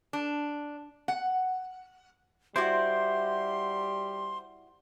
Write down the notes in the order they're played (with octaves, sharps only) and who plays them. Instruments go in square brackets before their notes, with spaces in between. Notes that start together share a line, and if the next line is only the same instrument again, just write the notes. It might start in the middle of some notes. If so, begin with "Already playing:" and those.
[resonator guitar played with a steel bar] D4
F#5
[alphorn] G3 [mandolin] E4 F#4 D5 [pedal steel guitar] C5 [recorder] C6